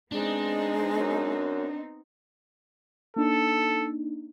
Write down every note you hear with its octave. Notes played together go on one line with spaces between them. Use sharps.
G#3 B3 C4 D4 D#4
F#2
A#3 D4 D#4 A4